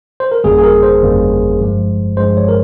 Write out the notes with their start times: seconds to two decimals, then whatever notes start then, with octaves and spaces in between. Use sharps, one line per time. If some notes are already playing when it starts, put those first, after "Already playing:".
0.20 C5
0.31 A#4
0.44 G1 F2 C#3 G3 A#3 G#4
0.58 G#4
0.63 A#4
0.83 C5
1.02 G1 F2 C#3 G3 A#3
1.60 G2 F3 G#3
2.17 G2 F3 G#3 C5
2.37 C#5
2.49 A#4